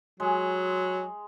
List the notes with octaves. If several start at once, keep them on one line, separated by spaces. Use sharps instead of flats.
F#3 G#3